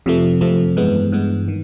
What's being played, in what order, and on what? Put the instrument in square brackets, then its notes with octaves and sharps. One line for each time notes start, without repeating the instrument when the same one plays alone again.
[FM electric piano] F2 C3 F3 A3
F2 C3 F3 A3
G2 E3 G#3 B3
G2 E3 G#3 B3
D#3